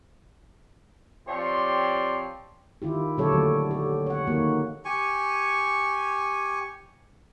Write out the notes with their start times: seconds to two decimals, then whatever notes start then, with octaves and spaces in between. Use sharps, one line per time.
1.28 F3 C4 G4 C#5 D5 C6
2.82 D#3 E4 F4 G4
3.17 A#2 D3 F#3 G4 A4 C#5
3.31 D3 F#3 A3
3.71 G4
4.06 C#5 F#5
4.27 D#3 A#3 F#4
4.85 G4 G#5 C#6